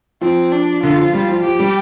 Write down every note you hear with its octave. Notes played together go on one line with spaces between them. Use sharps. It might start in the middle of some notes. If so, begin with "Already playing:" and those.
F3 C4
D4
D3 F4
F3
G3
F3
F3 G4
G3